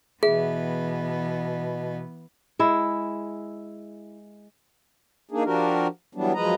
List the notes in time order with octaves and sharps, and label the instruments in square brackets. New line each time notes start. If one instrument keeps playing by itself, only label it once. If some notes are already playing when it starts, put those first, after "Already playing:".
[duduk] B2 [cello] E3 B3 [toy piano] G#4 [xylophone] E5
[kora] G#3 E4
[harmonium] A#3 D4 D#4 G#4
F3 D4 F#4 G4 A#4
E3 F#3 G3 B3 D4
F#2 F3 G#3 B4 D#5 A#5